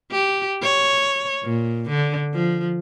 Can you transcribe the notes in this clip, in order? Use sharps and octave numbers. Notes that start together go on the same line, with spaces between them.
G4
C#5
A#2
D3
F3